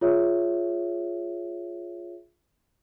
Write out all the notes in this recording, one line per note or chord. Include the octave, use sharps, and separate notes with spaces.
F4 G#4 C#5 E5